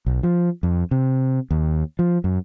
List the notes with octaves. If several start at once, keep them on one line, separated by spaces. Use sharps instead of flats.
B1
F3
F2
C3
D#2
F3
F#2